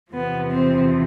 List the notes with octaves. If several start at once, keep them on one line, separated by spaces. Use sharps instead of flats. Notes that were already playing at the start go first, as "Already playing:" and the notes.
E2 C3 F3 B3
C4